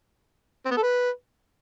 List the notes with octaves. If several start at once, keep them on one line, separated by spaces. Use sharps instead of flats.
C4
B3
A4
B4